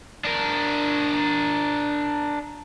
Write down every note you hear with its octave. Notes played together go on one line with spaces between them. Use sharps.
D4 A#4